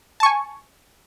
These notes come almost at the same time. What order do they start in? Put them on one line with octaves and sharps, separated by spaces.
A5 C#6 G#5